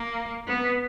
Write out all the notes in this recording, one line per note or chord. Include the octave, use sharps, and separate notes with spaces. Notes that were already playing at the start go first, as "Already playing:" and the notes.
Already playing: A#3
B3